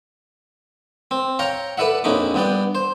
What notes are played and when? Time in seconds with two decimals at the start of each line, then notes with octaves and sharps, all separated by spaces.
1.11 C4
1.39 C#5 F5 G5 A#5
1.78 A4 B4 D5 E5 F#5
2.04 A#1 F2 C#4 D#4 B5 D6
2.34 G2 B3 D5 G5
2.75 C5